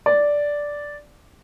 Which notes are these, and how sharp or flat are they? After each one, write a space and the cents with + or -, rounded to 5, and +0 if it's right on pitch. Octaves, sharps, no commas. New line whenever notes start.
D5 -5